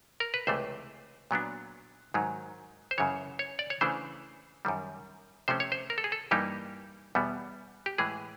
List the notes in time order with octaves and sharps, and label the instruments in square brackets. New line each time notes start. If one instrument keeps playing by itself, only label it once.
[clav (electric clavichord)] A#4
B4
C#2 C3 E3 A3 C5
A#2 F#3 B3 D4
G#2 D#3 F#3
C5
F#2 C#3 E3 C#5
C#5
D5
C#5
C#3 E3 A3 D4 C5
F#2 D#3 G3
C3 F3 A3 C#4 C5
C#5
C5
A#4
A4
G#4
A4
G2 E3 G3 A#3 D#4 G4
E2 B2 G3 B3
G4
A2 E3 G#3 G#4